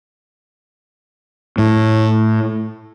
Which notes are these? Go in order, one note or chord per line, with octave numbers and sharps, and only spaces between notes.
A2